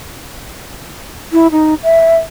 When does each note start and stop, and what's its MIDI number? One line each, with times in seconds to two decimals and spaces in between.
1.33 1.47 64
1.52 1.74 63
1.83 2.18 76